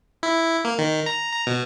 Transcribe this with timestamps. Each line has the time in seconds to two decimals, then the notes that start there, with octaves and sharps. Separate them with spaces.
0.23 E4
0.65 A#3
0.78 D#3
1.06 A#5
1.32 A#5
1.47 B2